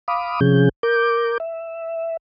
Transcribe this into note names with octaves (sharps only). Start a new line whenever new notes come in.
F5 B5 D6 D#6
C3 F3 C#4 G#4 G6
A#4 D6 G6
E5